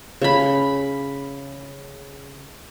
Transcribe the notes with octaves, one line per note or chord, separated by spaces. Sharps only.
C#3 B5